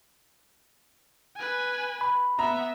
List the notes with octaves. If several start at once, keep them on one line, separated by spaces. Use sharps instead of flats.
B4 G#5
B5
B3 E5 A#5